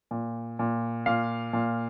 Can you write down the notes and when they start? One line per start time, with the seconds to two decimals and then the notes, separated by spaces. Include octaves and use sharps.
0.11 A#2
0.59 A#2
1.06 A#2 F5
1.53 A#2